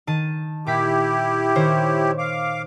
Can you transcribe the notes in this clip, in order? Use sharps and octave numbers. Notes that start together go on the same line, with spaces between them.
D#3 A5 D#7
A#2 E4 G4 D6 B6
D#3 C5 C#5
F5 D6